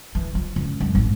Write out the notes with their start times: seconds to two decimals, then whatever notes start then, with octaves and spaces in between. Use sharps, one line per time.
0.15 E3
0.35 F3
0.56 C#2
0.80 F#2
0.95 G#1